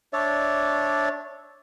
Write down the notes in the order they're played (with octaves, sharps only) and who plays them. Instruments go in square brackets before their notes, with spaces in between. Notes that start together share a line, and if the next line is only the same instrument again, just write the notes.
[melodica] D4 C#5 D5 E5